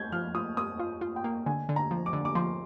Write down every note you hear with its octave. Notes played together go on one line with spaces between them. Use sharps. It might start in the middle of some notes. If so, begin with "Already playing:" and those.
Already playing: G6 G#6
F3 F6
F4 D#6
A#3 D#6
F4
F4
G5
A#3
D3 G#5
D3
A#5
F3
D6
D3
D6
F3 C6